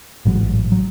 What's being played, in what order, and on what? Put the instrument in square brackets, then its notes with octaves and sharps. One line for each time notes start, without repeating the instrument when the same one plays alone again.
[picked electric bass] A1 G#2 F#3
F#3